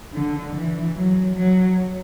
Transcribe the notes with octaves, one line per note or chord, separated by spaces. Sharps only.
D3
E3
F#3
F#3